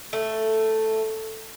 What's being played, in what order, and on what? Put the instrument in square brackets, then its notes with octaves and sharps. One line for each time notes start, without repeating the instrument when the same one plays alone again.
[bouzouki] A3